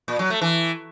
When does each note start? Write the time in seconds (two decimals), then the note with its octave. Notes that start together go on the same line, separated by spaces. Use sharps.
0.08 A#2
0.19 F#3
0.30 A3
0.41 E3